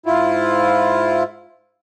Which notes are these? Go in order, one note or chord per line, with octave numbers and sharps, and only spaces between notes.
G#2 E4 F4